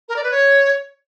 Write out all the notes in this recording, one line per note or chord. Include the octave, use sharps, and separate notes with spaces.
A#4
D5
B4
C#5